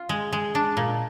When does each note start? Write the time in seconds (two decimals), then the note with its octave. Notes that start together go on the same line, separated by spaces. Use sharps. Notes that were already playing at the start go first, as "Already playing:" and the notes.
Already playing: F4
0.09 G#3
0.32 G#3
0.55 D4
0.77 A#2